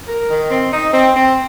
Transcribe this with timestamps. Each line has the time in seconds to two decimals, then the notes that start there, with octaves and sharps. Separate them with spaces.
0.08 A#4
0.30 D#3
0.51 C4
0.73 D#4
0.93 C4
1.15 C4